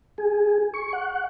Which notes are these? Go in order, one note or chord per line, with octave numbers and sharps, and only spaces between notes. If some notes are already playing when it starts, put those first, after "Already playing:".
G#4
C#6
F#5